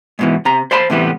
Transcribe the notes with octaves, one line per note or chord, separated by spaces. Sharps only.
G#2 B2 E3
C3 A#5
C5 D5 F5 A5 B5 C6
A2 C3 E3 G3 B3